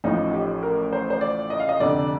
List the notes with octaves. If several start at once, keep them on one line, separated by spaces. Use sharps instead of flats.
A1 A2 F3 D#4
G4
A#4
C5
C5
D5
D#5
F5
D#5
F1 F2 D3 D5